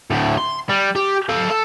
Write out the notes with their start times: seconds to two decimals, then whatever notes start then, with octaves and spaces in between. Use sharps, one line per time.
0.10 D2 A2
0.38 C6
0.69 G3
0.96 G4
1.29 A4 F5
1.50 A4